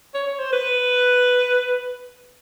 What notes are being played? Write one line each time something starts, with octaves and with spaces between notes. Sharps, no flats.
C#5
C#5
C5
B4